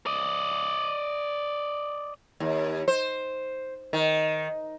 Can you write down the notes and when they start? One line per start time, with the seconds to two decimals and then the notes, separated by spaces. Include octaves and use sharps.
0.06 D5 D#5
2.40 D#2
2.88 C5
3.93 D#3